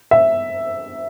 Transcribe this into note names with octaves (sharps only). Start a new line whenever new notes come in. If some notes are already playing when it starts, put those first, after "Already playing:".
E5